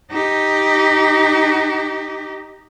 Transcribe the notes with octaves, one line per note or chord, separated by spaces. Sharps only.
D#4 G4